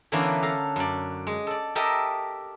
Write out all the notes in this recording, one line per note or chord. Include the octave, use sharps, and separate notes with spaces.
D3 E3 A#3 B3 C#4 D4
A4 F5 A#5
F#2 D5
G#3
A4 D5
G4 A4 A#4 D#5 E5